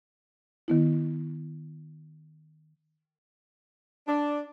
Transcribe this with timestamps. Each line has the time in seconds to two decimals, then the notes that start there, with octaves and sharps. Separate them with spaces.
0.68 D#3 B3 E4
4.07 D4